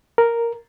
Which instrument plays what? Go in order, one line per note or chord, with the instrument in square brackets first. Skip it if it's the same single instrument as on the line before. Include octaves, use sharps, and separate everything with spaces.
[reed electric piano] A#4